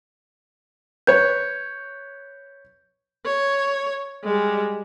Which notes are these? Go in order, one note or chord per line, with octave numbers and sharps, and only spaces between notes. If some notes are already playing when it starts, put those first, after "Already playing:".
B4 C#5 G6
C#5
G3 G#3